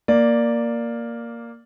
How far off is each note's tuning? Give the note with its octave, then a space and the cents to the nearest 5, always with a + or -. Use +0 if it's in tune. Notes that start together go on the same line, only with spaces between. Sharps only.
A#3 +0 D5 +0